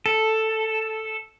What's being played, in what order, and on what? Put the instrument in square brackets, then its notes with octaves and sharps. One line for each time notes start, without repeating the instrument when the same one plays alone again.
[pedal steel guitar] A4